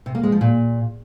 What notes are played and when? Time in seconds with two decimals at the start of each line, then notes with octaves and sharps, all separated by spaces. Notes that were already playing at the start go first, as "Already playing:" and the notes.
0.06 C3
0.15 A#3
0.23 G#3
0.32 F3
0.41 A#2